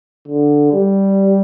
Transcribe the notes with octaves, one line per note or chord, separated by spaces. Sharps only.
D3
G3